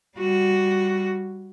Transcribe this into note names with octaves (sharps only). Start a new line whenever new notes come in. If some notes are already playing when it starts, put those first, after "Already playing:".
G3 F#4